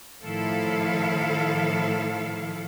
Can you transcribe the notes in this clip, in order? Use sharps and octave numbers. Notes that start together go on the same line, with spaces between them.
A2 D#3 F3 E4 A4 F5